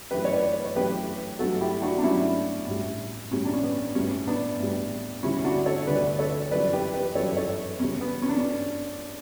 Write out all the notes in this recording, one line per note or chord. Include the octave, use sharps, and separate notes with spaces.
F#2 E3 A3 G4 B4
C#5
B4 D5
B4
C#5
F#2 E3 A3 G4 B4
G2 F#3 A3 F#4 A4
E4 G4
D4 F#4
D4
G2 F#3 A3 C#4 E4
A2 G3
A2 G3 C#4
D4
C#4
B3
A2 G3 C#4
B3 D4
A2 G3
D2 D3 G3 C#4 E4
D4 F#4
A4 C#5
D2 D3 G3 B4 D5
A4 C#5
F#2 E3 G3 B4 D5
G4 B4
G4 B4
F#2 E3 G3 A4 C#5
A4 C#5
E2 C#3 G3 C#4
B3
C#4
D4
C#4